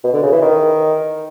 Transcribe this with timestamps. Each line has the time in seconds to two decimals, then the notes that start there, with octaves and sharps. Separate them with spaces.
0.04 B2
0.13 D3
0.23 C#3
0.32 E3
0.41 D#3